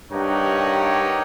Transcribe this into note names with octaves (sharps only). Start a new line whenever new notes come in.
G2 D#4 G4 A#4 C#5 F#5